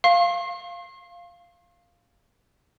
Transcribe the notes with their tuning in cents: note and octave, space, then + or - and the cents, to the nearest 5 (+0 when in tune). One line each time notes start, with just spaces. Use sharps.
F5 +0 C6 +45